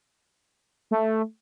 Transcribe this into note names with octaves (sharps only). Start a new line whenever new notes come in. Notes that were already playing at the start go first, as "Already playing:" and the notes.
A3